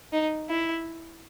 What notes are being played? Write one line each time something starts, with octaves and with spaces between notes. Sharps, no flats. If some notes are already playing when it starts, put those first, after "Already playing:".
D#4
E4